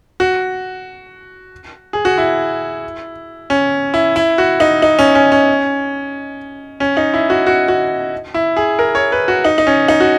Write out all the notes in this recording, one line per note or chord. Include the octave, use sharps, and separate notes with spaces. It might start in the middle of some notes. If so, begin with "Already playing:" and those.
F#4
G#4
F#4
E4
C#4
E4
E4
F#4
D#4
D#4
C#4
C#4
C#4
C#4
D#4
E4
F#4
F#4
F#4
E4
G#4
A#4
C#5
B4
F#4
D#4
D#4
C#4
D#4
F#4